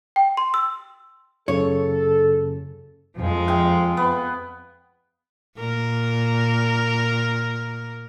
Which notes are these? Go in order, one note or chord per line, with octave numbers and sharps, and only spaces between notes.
G5
C6
E6
F#2 C#3 A4 C#5
F2 F3 G#3
G#4 F5 G5
B3
A#2 A#4